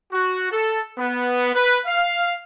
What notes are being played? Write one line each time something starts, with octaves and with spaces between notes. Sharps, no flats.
F#4
A4
B3
B4
F5